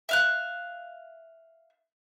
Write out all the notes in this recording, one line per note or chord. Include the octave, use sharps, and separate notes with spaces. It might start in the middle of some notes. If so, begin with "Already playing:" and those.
E5 F5 F#6